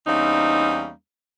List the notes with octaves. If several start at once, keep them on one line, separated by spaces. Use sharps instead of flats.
E2 G3 A#3 C4 C#4 D#4